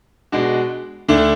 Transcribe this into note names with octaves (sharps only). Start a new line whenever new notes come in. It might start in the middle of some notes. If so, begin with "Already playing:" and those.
B2 G#3 D4 F#4
D2 D3 A3 D4